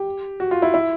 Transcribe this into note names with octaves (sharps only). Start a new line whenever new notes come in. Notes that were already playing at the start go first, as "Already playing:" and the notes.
Already playing: G4
F#4
F4
E4
E4